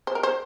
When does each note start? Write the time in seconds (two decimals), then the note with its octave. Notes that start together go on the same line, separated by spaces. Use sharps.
0.07 C5
0.15 A#4
0.23 C5